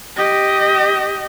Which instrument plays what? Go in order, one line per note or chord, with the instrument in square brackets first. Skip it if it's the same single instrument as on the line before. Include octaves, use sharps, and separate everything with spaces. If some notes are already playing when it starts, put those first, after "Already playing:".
[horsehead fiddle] G4 D#5